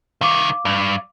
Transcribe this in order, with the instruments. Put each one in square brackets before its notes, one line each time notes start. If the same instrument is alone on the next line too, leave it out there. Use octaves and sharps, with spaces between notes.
[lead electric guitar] C2 D#3 [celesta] F5 D6
[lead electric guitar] G2